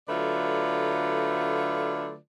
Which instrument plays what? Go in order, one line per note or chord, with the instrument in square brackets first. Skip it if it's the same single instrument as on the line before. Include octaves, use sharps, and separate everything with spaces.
[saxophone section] D3 F#3 A3 F4 B4 D5